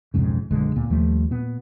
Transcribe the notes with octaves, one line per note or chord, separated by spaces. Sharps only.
B1 F2 G#2 C#3
A#1 F#2 D3 G#3
D1 A#2 B3
D#2 F3 G3 A3
A#2 B3